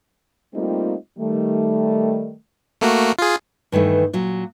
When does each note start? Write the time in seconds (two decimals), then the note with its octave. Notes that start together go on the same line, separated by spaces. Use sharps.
0.54 G3 A3 A#3 C4 D#4 F4
1.19 D#3 G3 A3
2.81 A3 A#3 F#4
3.19 F4 G#4
3.72 G2 D#3 E3 A3
4.13 A#2 F#3